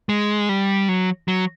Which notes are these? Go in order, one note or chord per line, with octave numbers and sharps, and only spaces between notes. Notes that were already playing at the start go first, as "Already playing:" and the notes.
G#3
G3
F#3
F#3